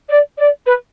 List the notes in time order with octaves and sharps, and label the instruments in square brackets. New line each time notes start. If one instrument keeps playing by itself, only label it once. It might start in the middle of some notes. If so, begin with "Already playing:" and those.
[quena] D5
D5
B4